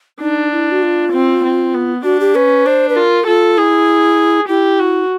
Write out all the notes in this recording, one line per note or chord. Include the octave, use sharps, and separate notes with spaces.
D4 D#4
E4
F#4
F4
C4
C4
B3
D4 F#4
G4
C#4 B4
D4 C5
B4
F4 A#4
F4 A4
E4 G#4
E4 G4
F#4